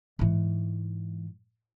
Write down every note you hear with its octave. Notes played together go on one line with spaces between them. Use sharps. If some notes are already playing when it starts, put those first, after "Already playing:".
G#2 E3